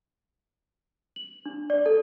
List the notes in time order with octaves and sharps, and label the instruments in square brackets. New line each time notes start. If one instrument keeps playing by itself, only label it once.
[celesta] F#7
D4
D5
A4